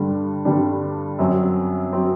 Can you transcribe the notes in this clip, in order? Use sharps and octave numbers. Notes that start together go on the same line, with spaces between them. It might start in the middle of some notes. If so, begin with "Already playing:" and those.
Already playing: G2 D3 G3 D4
G2 D3 G3 D4
F#2 F#3 C4
F#3 C4